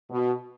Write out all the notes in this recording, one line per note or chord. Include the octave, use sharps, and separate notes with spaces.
B2